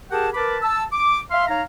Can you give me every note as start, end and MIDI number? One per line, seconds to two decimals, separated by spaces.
0.11 0.29 67
0.11 0.29 68
0.11 0.29 70
0.11 0.29 78
0.11 0.29 79
0.11 0.29 81
0.34 0.57 70
0.34 0.57 71
0.34 0.57 81
0.34 0.57 83
0.34 0.57 86
0.63 0.83 81
0.63 0.83 88
0.93 1.20 86
1.31 1.46 76
1.31 1.46 77
1.31 1.46 84
1.48 1.61 63
1.48 1.61 73
1.48 1.61 77
1.48 1.61 82